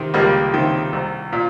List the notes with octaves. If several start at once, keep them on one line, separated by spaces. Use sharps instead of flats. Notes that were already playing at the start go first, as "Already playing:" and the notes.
Already playing: C3 D#3
C#2 G3 A#3
C3 D#3
C2
A#2